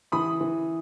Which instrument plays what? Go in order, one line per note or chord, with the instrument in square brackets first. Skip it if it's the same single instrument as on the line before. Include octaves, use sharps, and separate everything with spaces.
[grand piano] E3 B5 D#6
E3